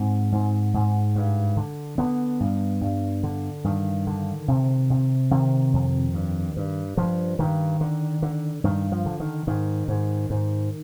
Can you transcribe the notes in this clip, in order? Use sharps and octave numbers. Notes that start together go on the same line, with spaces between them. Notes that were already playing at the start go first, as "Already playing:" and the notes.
Already playing: G#2 C4
G#2
G#2
G2
D3
D3 B3
G2
G2
D3
G2 D#3
D3
C3
C3
C3 D#3
F2
G2
G2
G2 F3
G2 D#3
D3
D3
G2 D#3
F3
D3
D#3
G#2 D#3
G#2
G#2